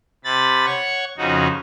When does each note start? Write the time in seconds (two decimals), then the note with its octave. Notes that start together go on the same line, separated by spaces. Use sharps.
0.24 C3 B5 A6
0.66 C#5 F#5 C#6
1.18 F2 C#3 D#4 F#4